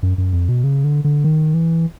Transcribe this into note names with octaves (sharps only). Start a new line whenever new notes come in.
F#2
F#2
F2
B2
C#3
D3
D3
D#3
E3